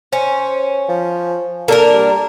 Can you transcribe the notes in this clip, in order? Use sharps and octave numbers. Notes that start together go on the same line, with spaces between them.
C#4 C5
F3
A#3 D4 A4 A#4
G3